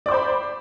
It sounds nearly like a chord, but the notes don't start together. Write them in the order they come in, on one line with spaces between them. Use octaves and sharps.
D5 D6 C5 B5